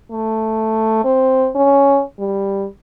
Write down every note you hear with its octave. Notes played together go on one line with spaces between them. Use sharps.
A3
C4
C#4
G3